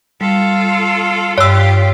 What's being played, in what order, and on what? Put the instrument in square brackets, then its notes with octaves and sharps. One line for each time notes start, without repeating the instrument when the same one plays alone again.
[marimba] G3 [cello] F4 A4
[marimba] G2 [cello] F4 G4 [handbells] C#5 E6